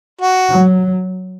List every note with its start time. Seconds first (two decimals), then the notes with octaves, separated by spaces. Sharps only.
0.21 F#4
0.50 F#3